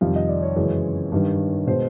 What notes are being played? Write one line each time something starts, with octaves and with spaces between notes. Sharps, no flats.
F2 C3 D#3 G3 F5
D#5
D5
C#5
F#2 C#3 E3 G#3
G2 D#3 G3
B2 G#3 C5